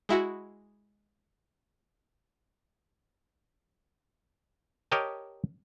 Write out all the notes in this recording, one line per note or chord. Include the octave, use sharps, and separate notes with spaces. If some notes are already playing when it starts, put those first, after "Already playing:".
G#3 E4 F#4
G4 A#4 C#5 D#5 G5 A5